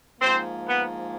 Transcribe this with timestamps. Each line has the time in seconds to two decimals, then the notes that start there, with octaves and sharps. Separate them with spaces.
0.21 G#2 F3 A#3 C4 C5
0.67 B3 B4